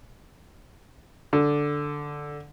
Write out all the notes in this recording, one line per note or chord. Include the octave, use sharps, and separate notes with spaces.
D3